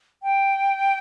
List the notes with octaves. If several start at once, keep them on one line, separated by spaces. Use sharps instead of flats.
G5